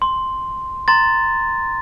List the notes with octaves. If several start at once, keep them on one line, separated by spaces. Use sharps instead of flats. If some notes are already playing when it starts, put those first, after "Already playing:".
C6
A#5 C6 A6